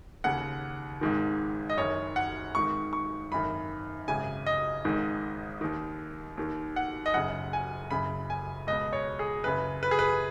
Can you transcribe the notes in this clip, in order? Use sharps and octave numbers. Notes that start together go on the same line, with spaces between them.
D#2 C#3 F#5
G#1 G#2 D#3
D#5
F#1 F#2 D#3 C#5
F#5
G#1 G#2 D#3 C#6
C#6
G#1 F#2 D#3 B5
G#1 F#2 C#3 G#5
D#5
G#1 G#2 D#3
D#2 D#3
D#2 D#3
F#5
D#5
F#1 F#2 C#3 F#5
G#5
F#1 F#2 C#3 B5
G#5
C#2 B2 D#5
C#5
G#4
F#1 F#2 C#3 B4
B4
G#4
B4